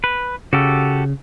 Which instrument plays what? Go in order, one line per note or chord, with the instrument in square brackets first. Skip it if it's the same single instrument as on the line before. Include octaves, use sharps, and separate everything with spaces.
[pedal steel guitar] B4
[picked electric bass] C#3 [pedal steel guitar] F#4 G4 A4